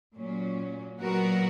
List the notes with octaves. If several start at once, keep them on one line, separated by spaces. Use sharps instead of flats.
A#2 F#3 C#4
A#2 F#3 B3 F#4 A#4